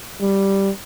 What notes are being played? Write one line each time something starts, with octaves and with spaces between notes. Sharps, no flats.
G3